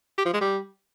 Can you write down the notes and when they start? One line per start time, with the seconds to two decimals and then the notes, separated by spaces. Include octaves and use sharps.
0.18 G4
0.26 F3
0.33 G#3
0.41 G3